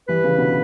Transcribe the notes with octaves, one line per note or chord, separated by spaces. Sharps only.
E3 G3 B4
C#3 E3
B2 D3